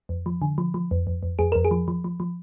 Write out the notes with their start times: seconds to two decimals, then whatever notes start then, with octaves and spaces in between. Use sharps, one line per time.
0.09 F2
0.26 F3
0.42 D3
0.58 F3
0.74 F3
0.91 F2
1.07 F2
1.23 F2
1.39 F2 G#4
1.52 F2 A#4
1.65 G#4
1.71 F3
1.88 F3
2.04 F3
2.20 F3